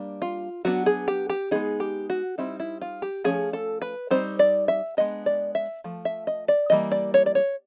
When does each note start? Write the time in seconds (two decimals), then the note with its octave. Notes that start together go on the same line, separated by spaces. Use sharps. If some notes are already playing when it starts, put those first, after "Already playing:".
Already playing: G3 A#3 D4
0.22 F4
0.65 F#3 B3 D4 F#4
0.86 G#4
1.08 G4
1.30 G4
1.51 G#3 B3 D#4 G#4
1.80 G4
2.10 F#4
2.38 G3 C4 D#4 E4
2.60 E4
2.81 F4
3.02 G4
3.24 F3 A3 C#4 G#4
3.53 A4
3.82 B4
4.11 G3 C4 D#4 C5
4.39 D5
4.68 E5
4.97 G#3 B3 D4 D#5
5.26 D5
5.55 E5
5.84 F3 A3
6.05 E5
6.27 D#5
6.48 D5
6.70 E3 G3 A#3 D#5
6.92 D5
7.14 C#5
7.26 D5
7.35 C#5